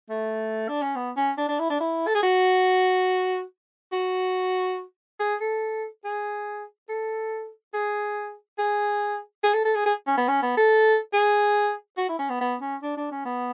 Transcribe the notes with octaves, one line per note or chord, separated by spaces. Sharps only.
A3
D4
C#4
B3
C#4
D4
D4
E4
D4
E4
A4
G#4
F#4
F#4
G#4
A4
G#4
A4
G#4
G#4
G#4
A4
A4
G#4
G#4
C#4
B3
C#4
B3
A4
G#4
F#4
E4
C#4
B3
B3
C#4
D4
D4
C#4
B3